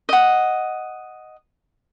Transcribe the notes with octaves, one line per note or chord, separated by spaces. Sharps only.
D#5 F#5